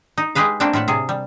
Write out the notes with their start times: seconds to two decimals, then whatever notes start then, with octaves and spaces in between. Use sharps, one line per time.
0.18 D#4
0.35 G#3 G4 G#4 B4 F5
0.60 A3 A#3 C4 D4 G5 A5
0.73 A2 F4 E5 F#5
0.88 C3 G#4
1.09 G3